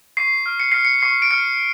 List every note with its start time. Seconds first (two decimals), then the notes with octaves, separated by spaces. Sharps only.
0.17 C#6 C7
0.46 F6
0.60 C#7
0.72 F6 C7
0.85 C#7
1.02 C#6 C7
1.22 D7
1.31 F6 C#7